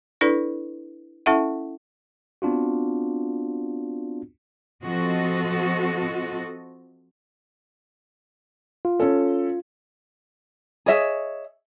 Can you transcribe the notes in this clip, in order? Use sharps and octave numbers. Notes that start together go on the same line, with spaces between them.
D4 E4 A4 B4 D5
C#4 E4 A4 E5 F#5
B3 C4 D4 F4 F#4
F3 C4 F#4 A4 D#5
F4
C#4 A4
G#4 C#5 D#5 E5